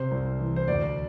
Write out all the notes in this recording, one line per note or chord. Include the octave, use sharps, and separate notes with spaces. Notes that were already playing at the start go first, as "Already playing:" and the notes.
Already playing: C3 C5
C2
E3
C5
D2 D5